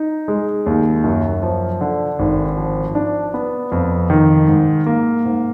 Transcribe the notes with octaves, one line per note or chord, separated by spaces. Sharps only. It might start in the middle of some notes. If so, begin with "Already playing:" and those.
Already playing: D#4
G#3
D#2
F#2
F3
D3
G#1
F3
D4
B3
F2
D#3
G#2
A#3
G#2